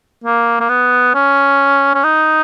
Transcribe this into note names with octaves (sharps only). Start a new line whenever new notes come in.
A#3
A#3
B3
C#4
C#4
D#4